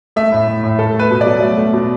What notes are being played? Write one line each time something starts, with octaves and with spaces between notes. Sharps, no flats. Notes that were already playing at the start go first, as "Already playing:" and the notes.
A3 E5
A2
A2
A2
A3 A4
A3
B4
B2
F#3 D5
A3
A3
B2